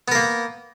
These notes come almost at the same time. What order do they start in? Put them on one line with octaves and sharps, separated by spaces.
B3 A#4 A#3